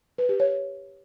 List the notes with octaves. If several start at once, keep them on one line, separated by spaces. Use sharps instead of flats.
B4
G4
C#5